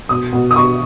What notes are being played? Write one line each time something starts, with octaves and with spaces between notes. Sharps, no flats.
B2 D#6
B2
D#6
B2 C#6